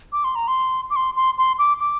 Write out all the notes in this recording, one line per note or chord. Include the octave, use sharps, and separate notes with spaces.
D6
C6
A#5
C6
D6
C6
C6
C6
D6
D6